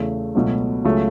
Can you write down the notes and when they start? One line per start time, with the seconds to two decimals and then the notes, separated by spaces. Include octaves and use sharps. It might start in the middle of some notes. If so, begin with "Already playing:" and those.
Already playing: E2 C#3 A3
0.35 C#2 B2 F#3 A3
0.84 C#2 C#3 F#3 A3